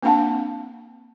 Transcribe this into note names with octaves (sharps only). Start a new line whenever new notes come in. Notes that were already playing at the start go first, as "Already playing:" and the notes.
A#3 C4 D4 F5 F#5 A5